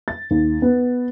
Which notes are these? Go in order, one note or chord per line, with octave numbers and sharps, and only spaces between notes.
A6
D#2
B3